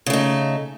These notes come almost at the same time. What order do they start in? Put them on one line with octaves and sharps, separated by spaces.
C#3 A3 D#4